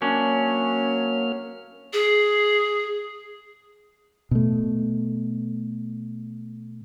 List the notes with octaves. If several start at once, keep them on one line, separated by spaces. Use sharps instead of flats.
F#3 A#3 C#4 D4 F6
G#4
B2 A3